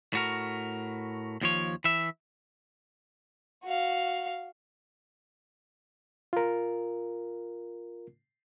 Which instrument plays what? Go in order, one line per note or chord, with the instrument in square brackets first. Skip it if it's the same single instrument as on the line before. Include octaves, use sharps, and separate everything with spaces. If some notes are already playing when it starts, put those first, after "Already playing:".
[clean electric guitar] A2 F#4 A#4
D#2 F3 C#5
E3 E5
[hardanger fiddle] F#4 F5
[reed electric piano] F4 A#4